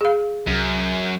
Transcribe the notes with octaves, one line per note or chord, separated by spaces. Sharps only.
G#4 F5
C2 F#2